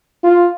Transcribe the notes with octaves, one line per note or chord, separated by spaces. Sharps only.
F4